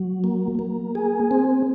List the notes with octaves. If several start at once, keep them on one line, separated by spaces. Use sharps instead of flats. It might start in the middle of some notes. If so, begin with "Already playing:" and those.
Already playing: F#3
A#3
A#3
G#4
C4